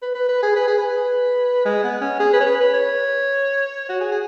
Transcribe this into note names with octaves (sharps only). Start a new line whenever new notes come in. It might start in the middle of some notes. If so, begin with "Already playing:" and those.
B4
B4
B4
G#4
B4
G#4
B4
G#3
B3
C#4
G#4
B4
C#5
B4
B4
C#5
F#4
G#4
G#4